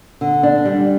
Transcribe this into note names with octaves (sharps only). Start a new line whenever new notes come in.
D3
D4
G3